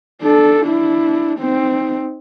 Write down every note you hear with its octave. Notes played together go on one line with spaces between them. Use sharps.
D4 A4
D4 E4
C4 D#4